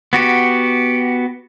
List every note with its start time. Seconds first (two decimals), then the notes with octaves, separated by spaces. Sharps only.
0.13 B3 F#4 G4